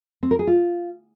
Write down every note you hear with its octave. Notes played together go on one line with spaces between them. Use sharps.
C4
A#4
G#4
F4